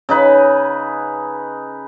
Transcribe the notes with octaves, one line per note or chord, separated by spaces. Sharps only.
C#3 D#4 B4